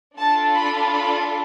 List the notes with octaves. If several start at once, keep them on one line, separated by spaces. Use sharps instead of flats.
D4 F4 A4 A5
B5
B5